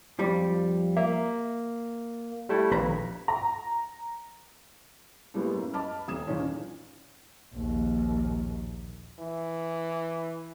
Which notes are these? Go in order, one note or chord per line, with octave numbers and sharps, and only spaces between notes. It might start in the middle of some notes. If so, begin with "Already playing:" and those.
F2 F3 G3
A#3 E5
G3 A3 E4
A#1 D#2 B4 A#5
A#5
A2 G3 G#3 A#3 B3
F#2
D#5 A5 B5 D6 F6
D#1 D#6 G#6 E7
E2 A#2 D#3 C#4 D4
A#1 D#2
E3